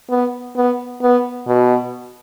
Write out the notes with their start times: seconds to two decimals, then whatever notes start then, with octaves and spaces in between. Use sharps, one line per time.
0.10 B3
0.56 B3
1.02 B3
1.47 B2